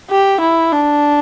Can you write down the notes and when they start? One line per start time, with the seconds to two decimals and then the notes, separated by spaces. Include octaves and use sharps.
0.10 G4
0.40 E4
0.72 D4